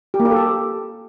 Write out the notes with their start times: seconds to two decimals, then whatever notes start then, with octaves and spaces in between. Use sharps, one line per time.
0.14 G4
0.20 A#3
0.25 G4
0.31 A4
0.37 G4